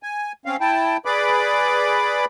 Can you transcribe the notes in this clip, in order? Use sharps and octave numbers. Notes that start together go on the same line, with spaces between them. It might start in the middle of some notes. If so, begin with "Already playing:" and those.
G#5
C4 C#4 F5
E4 G5 A5
G#4 B4 D5 B5 D6